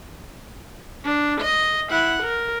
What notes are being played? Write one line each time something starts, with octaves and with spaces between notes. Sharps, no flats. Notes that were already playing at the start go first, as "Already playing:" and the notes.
D4
D#5
E4 F#5
A#4